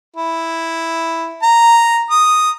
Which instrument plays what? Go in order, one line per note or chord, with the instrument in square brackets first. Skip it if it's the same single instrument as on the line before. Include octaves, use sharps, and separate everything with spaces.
[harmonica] E4
A#5
D#6